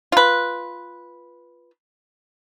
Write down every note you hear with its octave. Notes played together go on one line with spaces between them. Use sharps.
F4 B4